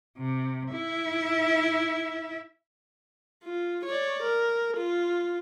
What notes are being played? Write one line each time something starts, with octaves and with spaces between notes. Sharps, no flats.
C3
E4 E5
F4
C#5 D5
A#4
F4